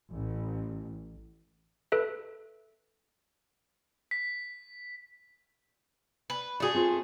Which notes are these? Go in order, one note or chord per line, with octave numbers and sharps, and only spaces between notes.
A1
A4 B4 E5
B6
B4
A3 F#4 G#4 D5
C4 F4 C5